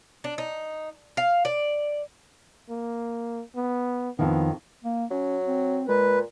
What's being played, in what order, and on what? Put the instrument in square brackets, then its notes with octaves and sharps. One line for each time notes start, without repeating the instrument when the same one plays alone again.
[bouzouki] D4
D#4
F5
D5
[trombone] A#3
B3
[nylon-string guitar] F2 D#3 [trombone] B3
[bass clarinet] A#3
[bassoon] F#3 [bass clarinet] C#4
[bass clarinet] C4
[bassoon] A#2 [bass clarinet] G#3 [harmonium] B4